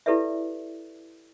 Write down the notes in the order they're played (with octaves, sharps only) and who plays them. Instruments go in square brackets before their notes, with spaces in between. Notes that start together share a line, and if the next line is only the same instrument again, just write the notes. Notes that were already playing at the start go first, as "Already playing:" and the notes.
[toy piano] E4 G4 A4 B4 D5 E5